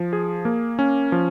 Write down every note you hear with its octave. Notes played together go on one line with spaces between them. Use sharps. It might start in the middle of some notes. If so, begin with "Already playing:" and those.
Already playing: F3
G#4
A#3
C#4
F3